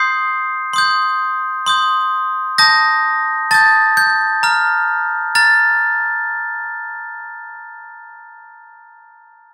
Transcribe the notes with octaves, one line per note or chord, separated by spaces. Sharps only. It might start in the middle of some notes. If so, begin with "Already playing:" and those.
Already playing: C6 D#6 G6 C7
C6 D#6 G6
C6 D#6 G6
A5 D#6 G6 A#6
A5 D#6 G6 A6
G6
A#5 F6
A#5 F6 A6